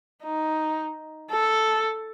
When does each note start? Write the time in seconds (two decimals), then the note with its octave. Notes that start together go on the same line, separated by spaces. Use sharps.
0.24 D#4
1.32 A4